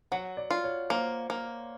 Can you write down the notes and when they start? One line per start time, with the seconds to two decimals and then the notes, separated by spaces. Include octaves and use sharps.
0.12 F#3 F#5
0.37 D5
0.51 F4
0.64 C#5
0.90 A#3 C5
1.30 A#3